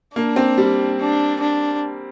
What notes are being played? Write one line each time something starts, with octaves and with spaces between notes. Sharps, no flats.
A#3 D4
C4
G3
D4
D4